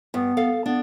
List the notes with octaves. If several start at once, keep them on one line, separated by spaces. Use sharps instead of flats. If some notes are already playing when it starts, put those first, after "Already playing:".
G2 B3
A4 F5
B3 D4